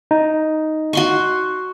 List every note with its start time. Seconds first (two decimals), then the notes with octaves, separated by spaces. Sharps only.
0.11 D#4
0.93 F#4 C6 C#6